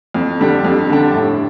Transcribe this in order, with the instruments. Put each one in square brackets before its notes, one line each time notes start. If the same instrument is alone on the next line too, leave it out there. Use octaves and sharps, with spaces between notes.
[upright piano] F2
D3 G3 D4
F2
D3 G3 D4
A2